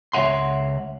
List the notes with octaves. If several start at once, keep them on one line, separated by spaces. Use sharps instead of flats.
C#2 C#5 E5 F#5 C6